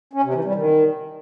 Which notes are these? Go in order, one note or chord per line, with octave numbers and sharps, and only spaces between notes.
C#4
C3
E3
G3
D#3